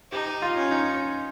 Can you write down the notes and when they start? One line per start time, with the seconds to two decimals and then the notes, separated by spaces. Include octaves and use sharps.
0.11 D#4 G4
0.42 F4
0.56 C#4
0.71 D#4